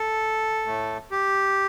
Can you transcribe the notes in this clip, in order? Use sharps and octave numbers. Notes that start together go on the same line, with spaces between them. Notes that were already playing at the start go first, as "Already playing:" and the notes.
Already playing: A4
A2 A3
G4